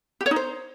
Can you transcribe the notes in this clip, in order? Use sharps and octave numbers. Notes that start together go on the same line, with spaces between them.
G4
C#5
D#4
C5